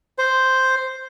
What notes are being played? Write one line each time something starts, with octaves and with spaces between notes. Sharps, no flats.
C5